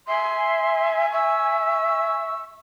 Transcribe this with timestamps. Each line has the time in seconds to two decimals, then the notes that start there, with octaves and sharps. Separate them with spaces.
0.08 E5 G#5 C6
1.12 E5 C#6 E6